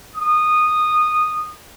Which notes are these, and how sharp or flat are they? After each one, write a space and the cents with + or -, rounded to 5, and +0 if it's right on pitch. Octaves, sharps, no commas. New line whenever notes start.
D#6 -15